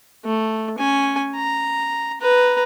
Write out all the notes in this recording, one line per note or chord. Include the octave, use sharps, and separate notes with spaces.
A3
C#4 G#5
A#5
B4 A#5